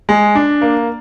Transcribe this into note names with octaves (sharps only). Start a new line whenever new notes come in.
G#3
D4
A#3